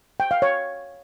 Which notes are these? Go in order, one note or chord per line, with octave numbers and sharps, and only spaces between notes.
G5
F5
C#5